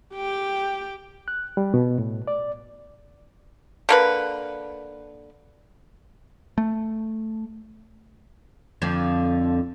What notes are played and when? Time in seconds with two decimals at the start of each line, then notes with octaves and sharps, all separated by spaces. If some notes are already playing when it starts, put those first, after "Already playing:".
0.15 G4 G5
1.28 F#6
1.57 G3
1.74 B2
1.99 A2
2.28 D5
3.89 D3 A#3 B4
6.58 A3
8.82 F2 D3 F3